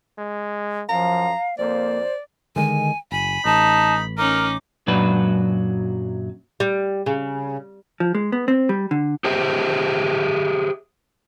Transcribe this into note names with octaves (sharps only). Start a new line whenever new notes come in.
G#3
F#2 F3 F5 A#5
F2 A#3 C5 D5
D3 D#3 G#3 G#5
F#1 G#5 B5
A1 D#4 A5
C#4 D#4 A#4 D6
F#2 A#2 F#3 D4 F#4 B4
G3
C#3
F3
G#3
B3
C4
G3
D3
G4 G#4 C5 D#5 E5